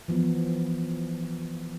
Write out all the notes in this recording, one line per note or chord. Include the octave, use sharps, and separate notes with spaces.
E3 F3 B3